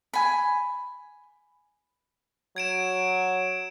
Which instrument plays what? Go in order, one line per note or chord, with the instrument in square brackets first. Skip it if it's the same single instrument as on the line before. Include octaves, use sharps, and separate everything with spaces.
[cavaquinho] G#5 B5
[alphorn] F#3 [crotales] G#6 D7 E7